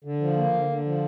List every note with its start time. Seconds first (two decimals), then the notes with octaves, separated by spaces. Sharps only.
0.04 D3
0.21 F3
0.37 A#3
0.53 D3
0.69 D3
0.85 F3